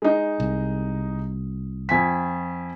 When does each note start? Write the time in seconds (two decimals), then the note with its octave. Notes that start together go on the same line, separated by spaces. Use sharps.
0.02 G#3 D#4
0.40 C2
1.89 F2 G#5 B6